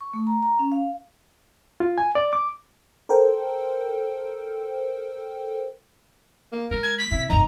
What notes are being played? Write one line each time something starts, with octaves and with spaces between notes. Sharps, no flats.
C#6
A3
A#5
A#5
C#4
F5
F4
G#5
D5
D6
A4 A#4 C5 G5
A#3
G#3 A#4
G#6
B6
C3 E4
F1 G2 D#4 A#5